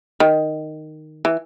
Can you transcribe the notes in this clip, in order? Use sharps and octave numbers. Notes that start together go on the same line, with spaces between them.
D#3
E3